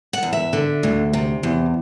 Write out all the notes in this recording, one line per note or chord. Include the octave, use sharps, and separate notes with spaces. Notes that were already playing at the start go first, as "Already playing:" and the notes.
F#5
E2
E5
D3
D2
C3
E2